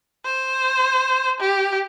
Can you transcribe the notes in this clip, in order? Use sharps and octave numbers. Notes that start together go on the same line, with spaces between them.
C5
G4